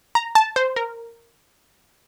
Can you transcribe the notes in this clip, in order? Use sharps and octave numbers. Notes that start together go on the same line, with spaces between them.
A#5
A5
C5
A#4